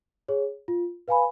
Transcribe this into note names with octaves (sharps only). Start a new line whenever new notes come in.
G#4 C#5
F4
B4 F5 G#5 B5